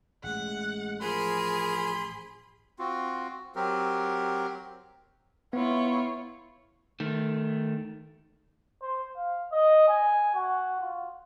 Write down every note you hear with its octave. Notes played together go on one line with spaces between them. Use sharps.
A1 G#3 F#5
F3 G#4 A#4 B5 C6
C4 F4 F#4
F#3 C4 G4 A#4
B3 E4 F4 C#5
D#3 A3
C5
F5
D#5
G#5
F#4
F4